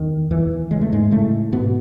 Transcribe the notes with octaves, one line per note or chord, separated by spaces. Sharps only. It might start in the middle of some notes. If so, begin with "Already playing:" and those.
Already playing: E2 D#3
E2 E3
C#3 G#3
A3
G#2 G#3
A2 C#3 A3
G#2 B2 B3